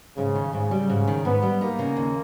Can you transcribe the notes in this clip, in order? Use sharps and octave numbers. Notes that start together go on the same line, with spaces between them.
G#2 C#3
D#3
G#2 C#3
G3
G#2
D#3
G#2 B3
G3
A#3 D#4
C#3
D#2